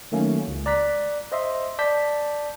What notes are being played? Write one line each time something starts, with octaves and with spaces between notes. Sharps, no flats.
D#3 F#3 A3 A#3 C#4
C#2
D5 A#5 F#6 B6
C5 D#5 E5 C6
D5 A5 G6 B6